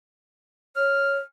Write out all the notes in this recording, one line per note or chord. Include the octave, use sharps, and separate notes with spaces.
C#5 F6